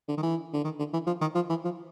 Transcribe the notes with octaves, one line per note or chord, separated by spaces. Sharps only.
D3
D#3
E3
D3
D#3
D3
E3
F3
D#3
F3
E3
F3